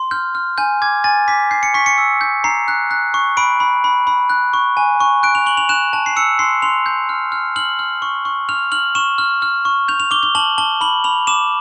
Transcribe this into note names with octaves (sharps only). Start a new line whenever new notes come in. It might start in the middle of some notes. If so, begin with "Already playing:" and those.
Already playing: C6
F6 G6
F6
G#5 G6
D6 G#6
G#5 A6
D6 B6
G6 C7
C#7
C#6 B6
C#7
E6
G6
A#5 C7
F#6
F#6
C#6
B5 D7
B5
B5
B5
F#6
C#6
G#5
C#6
F#6 D7
F7
C#6 F#7
F7
F#6 E7
A5
C7
E6 C#7
C6 C7
C6 F7
G6
F6
F6
F6 F#7
F6
C#6
C#6
F6 F7
F6 F#7
C#6 E7
F6
F6
C#6
G6 F7
F7
D6 G7
G7
A5 F#7
A5 G7
B5 F#7
B5 F7
D6 E7